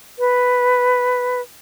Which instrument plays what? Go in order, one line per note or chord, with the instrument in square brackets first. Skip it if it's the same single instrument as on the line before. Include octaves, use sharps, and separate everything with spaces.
[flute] B4